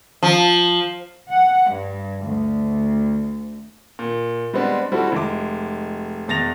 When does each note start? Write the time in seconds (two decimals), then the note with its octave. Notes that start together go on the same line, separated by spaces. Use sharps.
0.23 F3
1.31 F#5
1.69 G2
2.26 D2
3.99 A#2
4.54 G3 G#3 B3 C4 D4
4.92 G3 C4 E4 F#4 A4
5.12 F1 G#3 D6
6.28 E1 E2 A6 A#6 F7